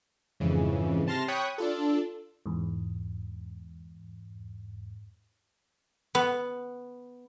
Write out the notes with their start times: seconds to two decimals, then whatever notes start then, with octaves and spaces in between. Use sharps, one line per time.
0.40 F2 G#2 C#3 E3
1.07 C3 A5 C6 F6 A#6
1.28 C#5 G5 B5 C#6 D#6 F#6
1.58 D4 F4 A4
2.46 E2 G#2
6.15 B3